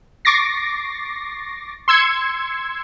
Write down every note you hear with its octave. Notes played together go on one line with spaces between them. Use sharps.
C#6 D6 A6 A#6 C7
C6 E6 G#6 C#7